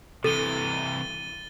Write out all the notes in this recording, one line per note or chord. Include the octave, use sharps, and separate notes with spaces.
C3 E3 A4 A6 D#7 G7